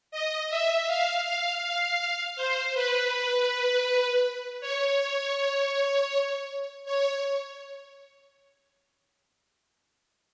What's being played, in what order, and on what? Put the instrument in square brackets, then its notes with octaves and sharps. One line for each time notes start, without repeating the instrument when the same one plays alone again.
[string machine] D#5
E5
F5
F5
F5
C5
B4
C#5
C#5